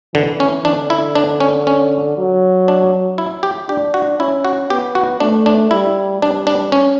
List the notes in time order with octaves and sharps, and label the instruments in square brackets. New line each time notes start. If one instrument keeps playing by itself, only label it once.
[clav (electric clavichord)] D3 [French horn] E3
[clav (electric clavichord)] C#4
[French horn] D3 [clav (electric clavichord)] D4
[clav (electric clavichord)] E4
D4
C#4
C#4
[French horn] F#3
[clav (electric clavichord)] D4
E4
G4
[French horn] D4 [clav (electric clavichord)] G4
[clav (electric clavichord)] F#4
[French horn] C#4 [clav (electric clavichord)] E4
[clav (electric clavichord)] F#4
[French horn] B3 [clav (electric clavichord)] G4
[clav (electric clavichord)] F#4
[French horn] A3 [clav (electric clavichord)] D4
[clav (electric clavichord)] D4
[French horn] G3 [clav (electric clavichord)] E4
[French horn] G3 [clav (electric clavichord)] D4
[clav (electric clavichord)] D4
C#4